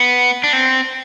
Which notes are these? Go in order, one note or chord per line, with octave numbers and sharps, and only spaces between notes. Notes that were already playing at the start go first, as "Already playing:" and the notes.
Already playing: B3
D4
C4